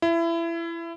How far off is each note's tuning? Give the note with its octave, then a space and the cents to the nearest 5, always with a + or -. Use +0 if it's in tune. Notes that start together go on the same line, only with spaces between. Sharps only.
E4 +25